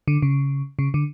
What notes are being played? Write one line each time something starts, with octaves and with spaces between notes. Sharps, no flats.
D3
C#3
C#3
D3